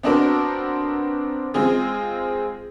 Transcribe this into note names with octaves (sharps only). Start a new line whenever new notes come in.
B3 C4 D4 F#4 A#4 C5
G#3 C4 F4 G#4